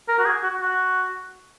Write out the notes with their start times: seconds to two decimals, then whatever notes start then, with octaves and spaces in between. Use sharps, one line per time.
0.08 A#4
0.19 F#4
0.26 G#4
0.44 F#4
0.61 F#4